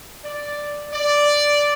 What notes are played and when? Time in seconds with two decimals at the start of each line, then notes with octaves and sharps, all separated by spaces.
0.23 D5
0.92 D5